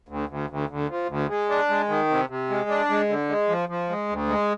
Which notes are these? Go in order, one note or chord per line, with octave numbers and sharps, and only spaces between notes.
D2
D2
D2
D2
F3
D2
G#3
D4
G#3
D#3
C3
C3
G#3
D4
G#3
D3
G#3
F3
F3
G#3
D2
G#3